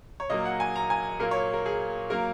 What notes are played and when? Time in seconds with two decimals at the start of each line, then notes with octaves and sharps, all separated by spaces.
0.20 C#5
0.30 A#2 F#3 A#3 D#5
0.45 F#5
0.60 G#5
0.76 A#5
0.90 G#5
1.19 A#2 F#3 A#3 A#4
1.31 C#5
1.53 A#4
1.66 G#4
2.10 F#3 A#3 A#4